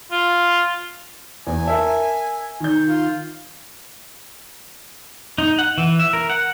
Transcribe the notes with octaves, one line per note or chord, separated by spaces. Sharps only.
F4
E2 G#5
A#4 E5 A5
D#3 G6
F4
D#4
F#5
E3
E5
A#4
F#5